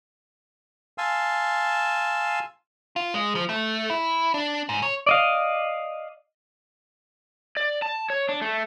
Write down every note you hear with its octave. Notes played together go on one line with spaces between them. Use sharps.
F5 G#5 A5 C6 E6
F4
G#3
F3
A3
E4
D4
G#2
C#5
D5 D#5 F5
D5
A5
C#5
D4
A3